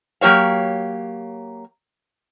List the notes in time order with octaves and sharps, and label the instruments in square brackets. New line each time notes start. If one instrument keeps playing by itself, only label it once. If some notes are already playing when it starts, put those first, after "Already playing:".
[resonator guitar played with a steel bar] F#3 A#3 G4 C#5 F5